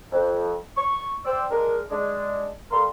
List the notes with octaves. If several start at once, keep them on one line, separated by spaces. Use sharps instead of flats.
F2
C#6
C5 D5 G5 E6
G#3 D4 A#4
G#3 D4
G3 A4 A#4 F5 C6